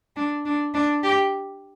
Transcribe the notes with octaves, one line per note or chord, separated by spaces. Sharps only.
D4
D4
D4
G4